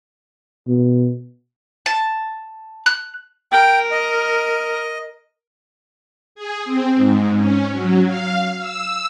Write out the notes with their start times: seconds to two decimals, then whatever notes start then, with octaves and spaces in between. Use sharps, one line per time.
0.68 B2
1.86 A5
2.86 F#6
3.52 A#4 G5
3.91 D#5
6.35 G#4
6.65 C4
6.96 G#2
7.36 C#4
7.71 F#3
8.06 F5
8.58 E6